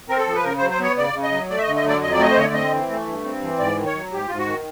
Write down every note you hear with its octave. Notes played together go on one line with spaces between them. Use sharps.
C4 A#4
A4
F3
B4
C#3 A#4
C5
F#3
C5
B3 C#5
C#3 D5
C#3
D#5
F#3
A3 D5
E5
D#5
D3
D#5
F#3 D5
F2 D#5
D5
A3 D#5
C5
D3 C#5
D5
C4 D#5
E3
A3
G2
C4
E3
G#2 D5
D#3
C#5
F#3
G#2 G4
G#2 F4
F#4
D#3